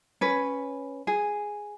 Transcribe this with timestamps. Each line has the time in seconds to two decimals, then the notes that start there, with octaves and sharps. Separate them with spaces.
0.21 C#4 B4
1.07 G#4